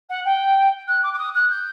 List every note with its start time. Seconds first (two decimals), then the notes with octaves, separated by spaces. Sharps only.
0.09 F#5
0.25 G5
0.87 F#6
1.03 D6
1.13 D6
1.18 D#6
1.34 F#6
1.50 G6